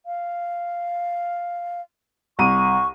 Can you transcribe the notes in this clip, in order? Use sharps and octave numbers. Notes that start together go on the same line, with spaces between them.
F5
C2 C#6 D#7